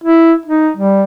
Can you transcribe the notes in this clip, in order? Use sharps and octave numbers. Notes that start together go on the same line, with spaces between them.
E4
D#4
G3